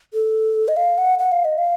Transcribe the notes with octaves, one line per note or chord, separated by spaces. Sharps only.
A4
D#5
F5
F#5
F#5
F5
D#5
F5